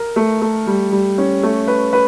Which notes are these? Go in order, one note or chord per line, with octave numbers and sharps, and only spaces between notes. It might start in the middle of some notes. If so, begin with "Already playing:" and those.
Already playing: A#4
A3
A3
G3
G3
C#4
A3
B4
B4